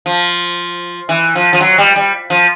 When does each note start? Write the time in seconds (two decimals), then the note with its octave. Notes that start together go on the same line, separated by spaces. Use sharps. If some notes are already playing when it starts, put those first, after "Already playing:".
0.06 F3
1.09 E3
1.35 F3
1.53 F3
1.61 F#3
1.78 G3
1.96 G3
2.30 F3